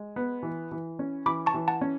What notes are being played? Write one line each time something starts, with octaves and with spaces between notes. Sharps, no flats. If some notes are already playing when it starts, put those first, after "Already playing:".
Already playing: G#3
B3
E3
E3
C#4
E3 B5 D6
A5 C#6
E3
F#5 A5
C#4